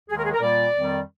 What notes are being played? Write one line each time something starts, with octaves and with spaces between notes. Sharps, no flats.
D#2 D#3 G#3 G#4
A#4
G#4
A#4
A#2 G3 A#3 D5
F2 D#3 G3